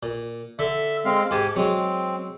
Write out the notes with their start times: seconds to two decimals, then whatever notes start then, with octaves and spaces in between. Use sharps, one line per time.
0.03 A#2
0.59 D3 E5
1.05 G#3 C4 F5
1.31 G#2 G4 G#5 A5 D#6
1.56 F#3 G#3 C4